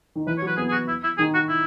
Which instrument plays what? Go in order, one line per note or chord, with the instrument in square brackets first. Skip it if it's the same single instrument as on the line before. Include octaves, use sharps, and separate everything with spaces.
[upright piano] D#3
[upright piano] E3 [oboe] B4
[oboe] C#5
[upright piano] F#3
[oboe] B4
[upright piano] B3 [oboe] G#4
[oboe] G#4
F#4
E4
E4
[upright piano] D#3 [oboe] G#4
[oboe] F#4
E4